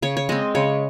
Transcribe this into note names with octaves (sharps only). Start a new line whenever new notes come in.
C#3 C#5
C#5
G#3 C4 D#5
C#3 C#5